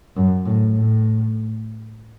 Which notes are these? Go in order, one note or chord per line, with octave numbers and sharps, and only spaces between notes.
F#2
A2
A2